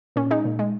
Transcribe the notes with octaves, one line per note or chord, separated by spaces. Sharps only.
A#2 C#4
G#3 D#4
A#2
G#3